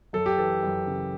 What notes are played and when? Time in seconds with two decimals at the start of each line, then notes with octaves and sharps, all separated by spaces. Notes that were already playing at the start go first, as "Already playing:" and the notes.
0.13 F#2 A4
0.26 G4
0.38 E3 A4
0.63 F#2
0.87 C#3